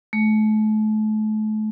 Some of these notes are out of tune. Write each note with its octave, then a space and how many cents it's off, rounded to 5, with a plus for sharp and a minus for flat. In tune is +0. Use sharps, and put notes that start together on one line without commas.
A3 -35